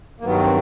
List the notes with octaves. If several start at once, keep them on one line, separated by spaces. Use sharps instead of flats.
A#3
G2 D#3 F#3 B3
C4